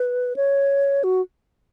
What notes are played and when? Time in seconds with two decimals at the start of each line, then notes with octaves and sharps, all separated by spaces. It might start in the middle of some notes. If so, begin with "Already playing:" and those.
Already playing: B4
0.36 C#5
1.04 F#4